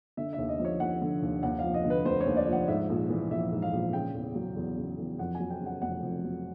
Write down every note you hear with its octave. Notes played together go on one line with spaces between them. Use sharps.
D3 E5
E5
D#2
D#5
F3
C#5
D#2 F#5
D3
D#2
D#2 F#5
F3 F5
D#5
D3
B4
F1 C5
C#5
D#2
D5
F3
F#5
G#2 E5
A#1
E3
A#1 E5
G#2
F5
A#1
C#3 G5
E2
F#3
E2
C#3
E2
F2 F#5
G#5
F#3
G5
C#3
F#5
F1 F#5
F2
F#3